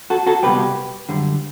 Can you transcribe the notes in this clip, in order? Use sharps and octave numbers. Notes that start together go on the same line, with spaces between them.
F#4 A4
F#4 A4
C2 B2 G3 G4 B4
F#2 D3 G3